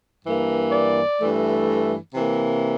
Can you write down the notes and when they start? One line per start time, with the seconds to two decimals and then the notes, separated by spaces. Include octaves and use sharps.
0.25 G2 E3 A#3
0.72 D5
1.20 G2 E3 A3
2.14 C3 E3 A#3